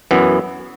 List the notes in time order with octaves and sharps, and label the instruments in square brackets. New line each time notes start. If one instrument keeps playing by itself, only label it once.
[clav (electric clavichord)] F#2 E3 B3